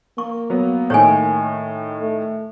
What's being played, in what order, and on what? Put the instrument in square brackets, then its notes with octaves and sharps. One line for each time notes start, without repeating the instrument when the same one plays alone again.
[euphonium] A#3 [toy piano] C#6
[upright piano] F#3 B3
[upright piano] A2 D#3 [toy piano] C#5 G#5
[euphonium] A3